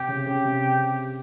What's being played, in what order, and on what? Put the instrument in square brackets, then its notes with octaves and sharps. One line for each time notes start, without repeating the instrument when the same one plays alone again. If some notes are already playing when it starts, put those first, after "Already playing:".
Already playing: [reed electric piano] C3 [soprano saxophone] G4
[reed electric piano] C#3
C#3
C3